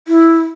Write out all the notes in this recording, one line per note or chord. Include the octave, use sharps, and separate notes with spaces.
E4